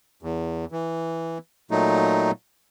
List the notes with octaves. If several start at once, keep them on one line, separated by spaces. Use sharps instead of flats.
E2
E3
A#2 F#3 A3 D#4